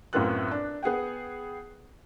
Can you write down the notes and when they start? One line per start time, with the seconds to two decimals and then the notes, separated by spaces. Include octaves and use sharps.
0.13 F#2 A2 B3 C4 F4 F#6
0.51 D4
0.83 B3 G#4 F#5 G5